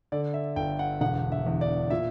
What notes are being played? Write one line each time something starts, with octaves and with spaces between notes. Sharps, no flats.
D3 D5
E5
G1 G5
F#5
E1 F#5
E5
E2
D5
A#2 E5